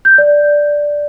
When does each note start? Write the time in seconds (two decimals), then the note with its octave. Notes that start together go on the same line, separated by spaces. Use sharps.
0.05 G6
0.18 D5